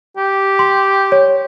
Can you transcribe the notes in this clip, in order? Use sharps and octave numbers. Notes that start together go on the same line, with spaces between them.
G4
C6
C#5